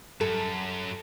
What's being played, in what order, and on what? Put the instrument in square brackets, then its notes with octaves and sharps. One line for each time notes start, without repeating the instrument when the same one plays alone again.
[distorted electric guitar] F#2 [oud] A4